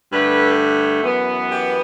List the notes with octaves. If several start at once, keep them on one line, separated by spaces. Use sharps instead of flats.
G2 D3 A3 B4
F#2 E3 B3
G4